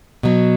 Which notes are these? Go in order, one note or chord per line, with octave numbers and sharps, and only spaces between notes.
B2 F#3